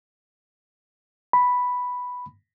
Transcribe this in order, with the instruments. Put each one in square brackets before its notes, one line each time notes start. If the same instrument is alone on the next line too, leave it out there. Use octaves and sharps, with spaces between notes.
[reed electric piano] B5